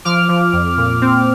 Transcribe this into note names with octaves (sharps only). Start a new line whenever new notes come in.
F3 D6 F6
F3
F2
A#2
C4